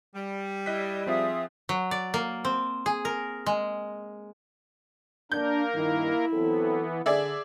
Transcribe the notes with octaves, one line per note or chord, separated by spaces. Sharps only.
G3
E4 D#5 F#6 B6
F3 C4 F4 G#4 E5 D#6
F#3
D5
A#3
C4
G#4
A#4
G#3
A#3 D4 A#4 G6
G2 D#3 E4
E3 F#3 B3 C4 A4
D3 G#4 D5 E5